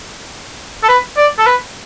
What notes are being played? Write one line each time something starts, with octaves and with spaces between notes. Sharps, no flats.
A4
B4
D5
A4
B4